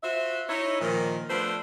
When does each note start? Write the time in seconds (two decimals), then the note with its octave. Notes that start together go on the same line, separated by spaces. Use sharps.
0.03 F4 F#4 C5 E5
0.49 D#4 E4 C#5
0.81 A#2 D#3 F3
1.30 F3 A3 B3 D4 B4 C5